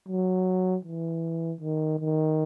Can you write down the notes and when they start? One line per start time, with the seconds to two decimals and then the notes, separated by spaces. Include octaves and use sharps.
0.08 F#3
0.85 E3
1.61 D#3
1.99 D#3